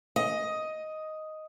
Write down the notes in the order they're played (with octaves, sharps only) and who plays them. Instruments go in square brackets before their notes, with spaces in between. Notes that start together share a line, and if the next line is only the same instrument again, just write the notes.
[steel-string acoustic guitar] D#5